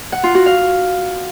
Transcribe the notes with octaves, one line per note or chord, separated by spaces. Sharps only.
F#5
F4
F#4
F5